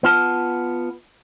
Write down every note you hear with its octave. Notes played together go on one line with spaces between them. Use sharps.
B3 F4 A5